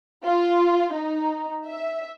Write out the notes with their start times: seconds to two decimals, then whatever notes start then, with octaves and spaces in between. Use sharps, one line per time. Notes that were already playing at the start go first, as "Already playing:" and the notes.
0.24 F4
0.93 D#4
1.67 E5